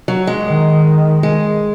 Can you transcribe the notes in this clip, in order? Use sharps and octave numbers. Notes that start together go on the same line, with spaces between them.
F#3
G#3
D#3
G#3